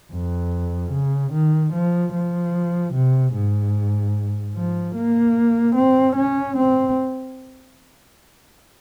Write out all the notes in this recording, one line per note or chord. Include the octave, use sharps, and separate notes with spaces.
F2
C#3
D#3
F3
F3
C3
G#2
F3
A#3
C4
C#4
C4